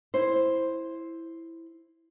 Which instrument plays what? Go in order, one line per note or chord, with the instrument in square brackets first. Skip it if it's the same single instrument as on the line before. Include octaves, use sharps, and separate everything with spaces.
[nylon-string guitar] E4 C5